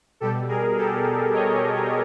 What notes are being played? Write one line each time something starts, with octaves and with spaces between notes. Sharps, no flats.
B2 G3 G4 A4
G#4 A#4
G4 A4
C#5 D#5